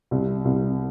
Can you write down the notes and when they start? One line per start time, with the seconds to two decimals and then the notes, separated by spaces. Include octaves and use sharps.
0.11 C2
0.45 C2